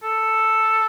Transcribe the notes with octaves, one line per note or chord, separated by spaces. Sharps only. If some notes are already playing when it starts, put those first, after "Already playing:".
A4